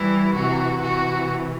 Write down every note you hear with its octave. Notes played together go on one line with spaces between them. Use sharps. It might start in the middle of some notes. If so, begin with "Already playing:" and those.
Already playing: E3 G3 E4
C3 E3 F#4
C3 E3 F#4